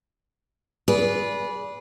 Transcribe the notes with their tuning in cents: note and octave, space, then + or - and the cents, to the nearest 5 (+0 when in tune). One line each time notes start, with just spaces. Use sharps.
G#4 +0 B4 -15 D5 -20